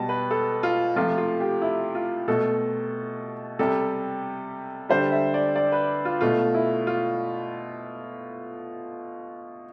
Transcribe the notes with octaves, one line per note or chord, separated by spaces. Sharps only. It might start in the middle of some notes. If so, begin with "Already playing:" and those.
Already playing: B2 G3 A5
B4
A4
F4
C3 F3 A3 F4
F4
G4
E4
F4
B2 A3 A4
C3 G3 A4
D3 G3 C5
E5
D5
D5
B4
F4
B2 A3 F4
E4
F4